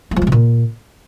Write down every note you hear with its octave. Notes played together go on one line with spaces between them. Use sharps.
A3
F3
G#3
C3
A#2